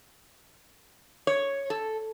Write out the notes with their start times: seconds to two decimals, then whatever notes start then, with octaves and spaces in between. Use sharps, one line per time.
1.27 C#5
1.70 A4